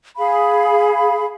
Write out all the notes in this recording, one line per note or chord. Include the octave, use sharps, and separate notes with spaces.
G#4 F5 B5